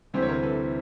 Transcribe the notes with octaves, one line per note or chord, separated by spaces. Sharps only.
D2 C3 E3 G3 C4 C5
C#5
A#4 C5
A4 B4